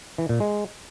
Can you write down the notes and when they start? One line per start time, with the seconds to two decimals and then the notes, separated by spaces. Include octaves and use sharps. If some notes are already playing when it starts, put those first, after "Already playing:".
0.18 E3
0.29 A#2
0.40 G#3